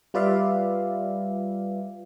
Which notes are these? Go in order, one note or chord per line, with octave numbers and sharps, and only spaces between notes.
G3 F4 B4 D5 E5 F5